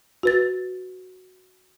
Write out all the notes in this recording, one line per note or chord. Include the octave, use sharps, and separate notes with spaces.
F#4 B4 A6